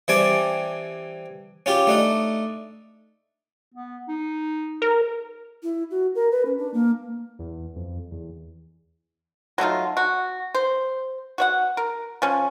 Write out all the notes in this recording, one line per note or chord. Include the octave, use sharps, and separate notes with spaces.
E3 G3 C4 G#5 A5 D6
C#4 F4 G4
A3 D4 D#4
B3
D#4
A#4
E4
F#4
A#4
B4
C#4
D4
A#3
E2
F2
E2
F#3 A3 D#4 F4
F#4
C5
F#4 C#5 F#5
A#4
F3 C#4